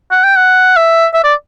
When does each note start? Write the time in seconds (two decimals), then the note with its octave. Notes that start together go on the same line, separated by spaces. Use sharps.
0.11 F#5
0.24 G5
0.37 F#5
0.76 E5
1.14 E5
1.24 D5